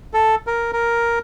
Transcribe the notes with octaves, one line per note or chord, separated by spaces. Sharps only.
A4
A#4
A#4